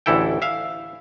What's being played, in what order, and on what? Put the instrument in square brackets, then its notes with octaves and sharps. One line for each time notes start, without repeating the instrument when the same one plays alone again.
[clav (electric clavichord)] A1 D2 E3 E4 A4 G5
E5 F5